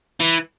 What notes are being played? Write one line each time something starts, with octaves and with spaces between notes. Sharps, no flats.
E3